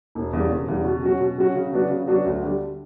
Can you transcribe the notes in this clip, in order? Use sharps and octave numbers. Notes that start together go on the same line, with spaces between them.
E1
E2 C#3 G3
E1
E2 C#3 G3
B2
F#3 C#4 F#4
B2
F#3 C#4 F#4
C#3
F#3 B3 D4 F#4
C#3
F#3 B3 D4 F#4
D2
D3 G3